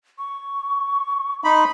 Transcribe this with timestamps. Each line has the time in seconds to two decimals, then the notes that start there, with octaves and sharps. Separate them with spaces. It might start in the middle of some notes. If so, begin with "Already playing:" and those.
0.18 C#6
1.44 D#4 B5 C6